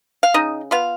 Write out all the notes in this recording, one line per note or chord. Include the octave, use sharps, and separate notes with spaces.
F5
C#3 D#4 D#5
B3 F4 F5